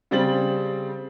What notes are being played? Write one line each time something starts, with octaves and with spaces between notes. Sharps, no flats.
C#3 G3 C4 C5 A6 F#7